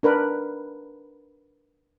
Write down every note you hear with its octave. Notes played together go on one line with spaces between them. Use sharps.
D4 A#4 B4